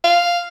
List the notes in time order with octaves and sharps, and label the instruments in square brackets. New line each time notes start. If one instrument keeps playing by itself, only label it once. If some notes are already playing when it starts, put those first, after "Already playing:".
[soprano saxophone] F5